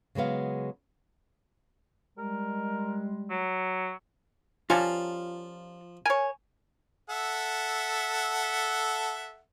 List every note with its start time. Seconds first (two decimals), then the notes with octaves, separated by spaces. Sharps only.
0.15 C#3 F#3 G#3 B3 F5
2.18 G3 G#3 A#4
3.30 F#3
4.70 F3 G3 C#4 F4 A#4 F5 A5
6.06 A#4 C#5 G#5
7.10 A4 E5 F#5